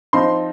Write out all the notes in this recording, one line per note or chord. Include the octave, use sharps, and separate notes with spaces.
F3 C4 D#4 C6